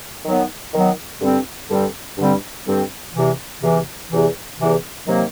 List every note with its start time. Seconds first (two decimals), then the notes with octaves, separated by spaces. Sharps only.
0.25 D#3 F#3 B3
0.73 D#3 F#3 B3
1.21 G2 D3 G3 C4
1.69 G2 D3 G3 C4
2.18 G2 D3 G3 C4
2.66 G2 D3 G3 C4
3.14 E2 C3 E3
3.62 E2 C3 E3
4.10 E2 C3 E3
4.58 E2 C3 E3
5.06 C3 D#3 F#3 A#3